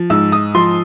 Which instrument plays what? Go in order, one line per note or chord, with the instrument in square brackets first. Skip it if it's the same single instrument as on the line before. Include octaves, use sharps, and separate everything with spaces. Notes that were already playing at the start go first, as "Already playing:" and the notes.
Already playing: [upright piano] F3
G#2 E6
D#6
F3 C6